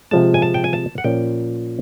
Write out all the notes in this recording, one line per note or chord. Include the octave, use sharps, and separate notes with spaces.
C3 F3 G#3 A5
G#5
A5
G5
G#5
A5
F#5
A#2 F3 A#3 C#4 G5